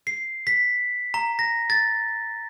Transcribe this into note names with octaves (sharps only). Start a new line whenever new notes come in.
C7
B6
A#5
A#6
A6